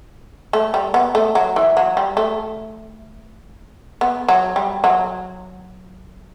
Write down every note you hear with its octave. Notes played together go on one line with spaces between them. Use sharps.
A3
G3
B3
A3
F#3
E3
F#3
G3
A3
B3
F#3
G3
F#3